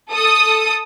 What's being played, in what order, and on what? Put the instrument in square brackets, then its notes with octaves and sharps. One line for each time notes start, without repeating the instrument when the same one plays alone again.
[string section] A4 D#6